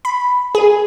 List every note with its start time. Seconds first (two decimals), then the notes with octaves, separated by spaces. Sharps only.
0.05 B5
0.55 G#4